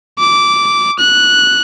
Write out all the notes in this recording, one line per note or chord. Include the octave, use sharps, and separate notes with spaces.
D6
F#6